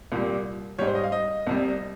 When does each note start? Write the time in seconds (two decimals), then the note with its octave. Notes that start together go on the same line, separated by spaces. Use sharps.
0.12 C2 A#2 G3
0.79 G#2 G3 C#5
0.87 C5
0.95 D#5
1.03 F5
1.12 D#5
1.47 C2 C3 G3